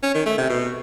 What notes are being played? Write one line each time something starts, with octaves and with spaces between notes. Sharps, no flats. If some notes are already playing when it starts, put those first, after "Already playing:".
C#4
D#3
A3
C3
B2